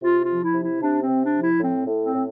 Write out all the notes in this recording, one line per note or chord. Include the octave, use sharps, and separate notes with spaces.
C3 F4
F4
F3
E4
C3
E4
C3 D4
C4
C3
D4
F3
E4
A2 C4
A2
C4
A2